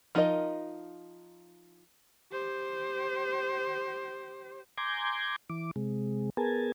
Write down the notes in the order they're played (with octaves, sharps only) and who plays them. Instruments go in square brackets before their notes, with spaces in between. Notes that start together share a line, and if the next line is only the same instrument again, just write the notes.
[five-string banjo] F3 D#4 F4 A#4 D#5
[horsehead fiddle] G4 C5
[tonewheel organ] G#5 A#5 C6 D6 G6 G#6
E3 D6
C3 G#3
B3 G#4 A#4 G#5 A5